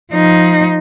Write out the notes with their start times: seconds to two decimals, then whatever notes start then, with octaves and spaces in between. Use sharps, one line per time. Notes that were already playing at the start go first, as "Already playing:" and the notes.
0.12 F3 D#4